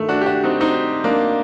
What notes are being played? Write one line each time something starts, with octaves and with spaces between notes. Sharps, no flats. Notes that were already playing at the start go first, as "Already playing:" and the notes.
Already playing: G2 D#3 A3
D4 F#4
G4
D4 F#4
C4 D#4
C4 D#4
A#3 D4